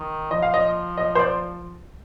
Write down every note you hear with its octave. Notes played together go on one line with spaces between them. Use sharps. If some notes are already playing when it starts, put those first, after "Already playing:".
Already playing: D#3
F3 D#5
F5
D#5
D#5
C5
D5